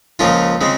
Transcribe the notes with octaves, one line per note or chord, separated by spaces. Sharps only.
C#2 C#3 F3 A#3 F4
C#3 G#3 C4